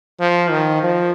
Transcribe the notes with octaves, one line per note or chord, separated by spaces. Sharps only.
F3
D#3
F3